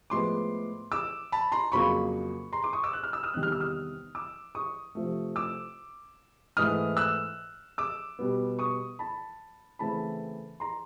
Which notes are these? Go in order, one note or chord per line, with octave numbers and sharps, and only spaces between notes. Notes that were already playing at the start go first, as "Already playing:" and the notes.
A2 F3 G#3 B3 C6 D6
D6 E6
A5 B5
A#5 C6
F2 C#3 F#3 A#3 B5 C#6
A#5 C6
C6 D6
C#6 D#6
D6 E6
F#6
F6
E6
D#6 F6
E2 C3 D#3 G3 F#6
F6
E6
D#6 F6
D6 E6
C#6 D#6
C3 F3 A3
D6 E6
G#2 E3 A3 D#6 F6
E6 F#6
D6 E6
B2 G3 B3
C#6 D#6
A5 B5
C#3 E3 A3 C4 A5 B5
A#5 C6